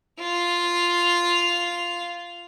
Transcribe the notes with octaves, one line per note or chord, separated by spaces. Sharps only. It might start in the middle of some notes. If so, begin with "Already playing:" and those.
F4 F7